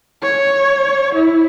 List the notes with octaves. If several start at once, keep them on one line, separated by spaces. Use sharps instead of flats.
C#5
E4